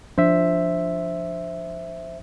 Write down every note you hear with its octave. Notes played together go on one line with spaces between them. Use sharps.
F3 D4 C5 E5